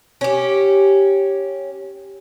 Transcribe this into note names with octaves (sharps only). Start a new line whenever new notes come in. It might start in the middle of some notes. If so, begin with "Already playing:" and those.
C#4 G4